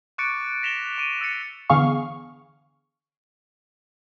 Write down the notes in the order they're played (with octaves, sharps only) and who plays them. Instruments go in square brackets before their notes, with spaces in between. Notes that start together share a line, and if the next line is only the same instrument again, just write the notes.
[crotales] C#6 D6 F#6 A6 C#7 D7
A#6 B6 E7 F7 G7
C#6 D7 D#7
E6 A6 C#7 D7
[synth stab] D3 E3 B3 G#4 F5 C#6